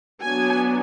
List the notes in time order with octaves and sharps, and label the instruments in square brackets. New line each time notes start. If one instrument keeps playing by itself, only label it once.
[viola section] F#3 B3 D4 G#5